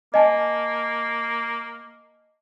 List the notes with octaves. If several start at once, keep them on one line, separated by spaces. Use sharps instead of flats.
A#3 D#5 G#5 A5